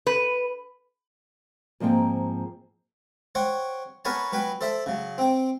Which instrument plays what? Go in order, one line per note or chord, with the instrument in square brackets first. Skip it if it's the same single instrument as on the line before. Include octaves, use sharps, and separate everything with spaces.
[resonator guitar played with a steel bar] B4
[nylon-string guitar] G#2 F3 A#3 C4 G5
[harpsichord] C5 C#5 F#5 G5
B3 A#4 B4 C#5 G#5 A5
F#3 B4 G5 G#5
A4 C5 D5 E5 A5
C#3 F#3
C4 G5